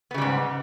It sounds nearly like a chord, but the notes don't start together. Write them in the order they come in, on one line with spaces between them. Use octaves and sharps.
B3 C#3 G3 G#2